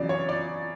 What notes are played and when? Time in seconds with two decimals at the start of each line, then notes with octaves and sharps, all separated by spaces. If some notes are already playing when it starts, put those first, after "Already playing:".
Already playing: E2 C#3 F#3 D5
0.09 C#5
0.29 D5